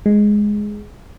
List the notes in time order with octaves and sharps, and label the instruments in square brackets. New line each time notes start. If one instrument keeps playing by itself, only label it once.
[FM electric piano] G#3